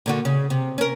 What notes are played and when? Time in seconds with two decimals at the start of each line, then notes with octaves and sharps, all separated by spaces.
0.06 A#2 D3 F#4
0.25 C#3
0.50 C3
0.78 C#4 A#4